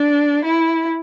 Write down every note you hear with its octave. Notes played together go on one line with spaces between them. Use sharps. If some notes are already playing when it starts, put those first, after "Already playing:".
Already playing: D4
E4